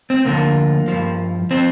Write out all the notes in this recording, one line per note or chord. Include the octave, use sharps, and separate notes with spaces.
C4
D2 D3 F3 A#3
G2 F3
F3 C4